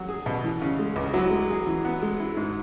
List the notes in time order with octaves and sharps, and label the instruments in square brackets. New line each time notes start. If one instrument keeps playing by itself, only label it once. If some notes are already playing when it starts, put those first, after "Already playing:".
Already playing: [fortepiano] F#3
G#4
B2
E3
C#3
G#3
C#2
[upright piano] F#3 [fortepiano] E4
[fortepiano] G#3
G#4
E3
B3
G#3
E4
G#2